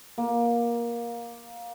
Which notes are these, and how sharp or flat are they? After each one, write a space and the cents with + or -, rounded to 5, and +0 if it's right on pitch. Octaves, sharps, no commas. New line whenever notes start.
A#3 +15